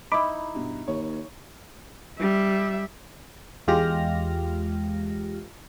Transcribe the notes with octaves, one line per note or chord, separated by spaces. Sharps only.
D#4 E4 B5 D6
G2 B2
D#2 C#5
G3 E5
E2 G#3 F4 G4 F6 A#6